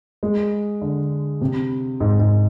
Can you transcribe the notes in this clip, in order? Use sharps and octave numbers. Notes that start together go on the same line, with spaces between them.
G#3
D3
C3
G#2
G#2